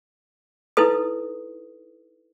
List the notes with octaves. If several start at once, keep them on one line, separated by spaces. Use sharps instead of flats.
D#4 E4 A4 B4 D#6